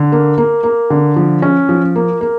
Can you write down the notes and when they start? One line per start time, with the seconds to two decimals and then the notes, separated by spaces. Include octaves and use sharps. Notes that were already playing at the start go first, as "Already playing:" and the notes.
Already playing: D3
0.12 A#3
0.38 A#3
0.64 A#3
0.90 D3
1.16 F3
1.42 C#4
1.69 F3
1.96 A#3
2.21 A#3